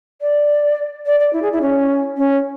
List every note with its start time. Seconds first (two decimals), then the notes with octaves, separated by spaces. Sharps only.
0.21 D5
1.06 D5
1.20 D5
1.33 E4
1.42 G#4
1.52 E4
1.62 C#4
2.18 C#4